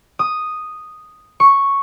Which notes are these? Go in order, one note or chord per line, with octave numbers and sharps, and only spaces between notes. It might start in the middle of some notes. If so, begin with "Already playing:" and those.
D#6
C#6